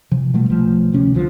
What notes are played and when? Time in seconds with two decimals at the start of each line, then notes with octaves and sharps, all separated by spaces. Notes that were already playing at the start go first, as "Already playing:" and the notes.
0.11 C3 F3
0.34 B2 F3 G3 A3
0.50 B1 F3 A3
0.92 D2 C3 C#4
1.14 C2 D3 F3